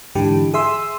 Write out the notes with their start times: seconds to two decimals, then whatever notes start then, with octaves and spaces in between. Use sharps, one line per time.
0.15 G#2 D3 E3 G4
0.54 G#4 E5 C6 E6